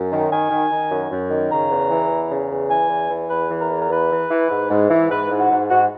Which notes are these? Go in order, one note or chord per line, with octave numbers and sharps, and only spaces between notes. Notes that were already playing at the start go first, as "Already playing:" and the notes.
Already playing: F#2
D#3
D#3 G#5
D#3
D#3
F#2
F#2
D#3
C#3 A#5
E2
E3
E2
C#3
E2
E3 G#5
E2
E3
E2 B4
E3
A#4
E2
A#4
E3 B4
E3
E3
G#2
G#2
E3
G#2 B4
G#2
F#4
G#2
G#2 F#4